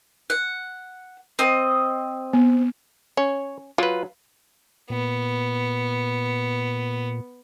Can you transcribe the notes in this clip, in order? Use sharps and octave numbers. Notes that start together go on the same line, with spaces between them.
F#5
C4 D#5
B3
C#4 C#5
F#3 F4 B4
A#2 B3